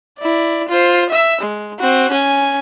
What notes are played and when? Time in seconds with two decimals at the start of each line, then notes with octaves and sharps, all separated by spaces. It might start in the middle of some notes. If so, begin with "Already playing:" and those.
0.19 E4 D5
0.68 F4 C5
1.10 E5 E6
1.41 G#3
1.79 C4 F#4
2.11 C#4 G#5